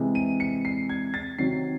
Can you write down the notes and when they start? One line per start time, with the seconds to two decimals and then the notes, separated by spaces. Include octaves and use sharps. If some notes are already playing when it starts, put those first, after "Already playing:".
Already playing: C3 E3 G#3
0.15 D#7
0.40 C#7
0.65 C7
0.89 G#6
1.14 A6
1.38 C3 D#3 F#3 C7